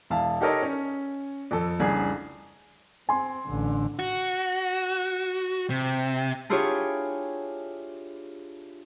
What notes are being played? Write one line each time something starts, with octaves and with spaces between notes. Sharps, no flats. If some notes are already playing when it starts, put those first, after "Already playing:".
E1 E4 F5 A5
D#4 G4 A4 A#4 C#5 D#5
C#4
F2 A4
F1 C2 C#3 D4 G#4
C4 G#5 C6
A1 D3
F#4
C3
D4 E4 F4 G4 G#4 C#5